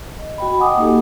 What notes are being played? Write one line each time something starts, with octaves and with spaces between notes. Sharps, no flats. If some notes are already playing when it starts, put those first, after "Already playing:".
D#5
F#4 G5 B5
D#5 F#5 G#5 D6 D#6
A#3 D#4 G4 A4